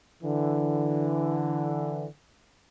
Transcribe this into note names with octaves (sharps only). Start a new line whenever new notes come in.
D3 E3